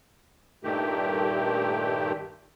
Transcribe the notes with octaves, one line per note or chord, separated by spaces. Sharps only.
G2 A#2 D#3 A3 G4